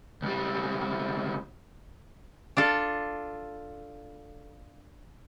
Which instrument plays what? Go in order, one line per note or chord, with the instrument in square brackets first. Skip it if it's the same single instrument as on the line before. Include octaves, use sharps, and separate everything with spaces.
[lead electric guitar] C#2 G3
[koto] D4 F4 A4